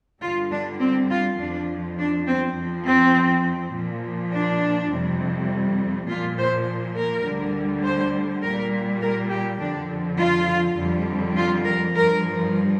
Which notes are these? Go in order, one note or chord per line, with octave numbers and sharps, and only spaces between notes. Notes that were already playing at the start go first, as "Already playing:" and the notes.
G2 D3 G3 F4
D4
C4
F4
F2 F3 D4
D4
C4
F2 F3
C4
A#2 F3
D4
F2 C3 G3
A#2 F3 F4
C5
A#4
D2 D3 G3
C5
A#2 G3 A#4
A#4
G4
F2 D3 F3 D4
F4
F2 D3 G3
F4
A#4
G2 F3 A#4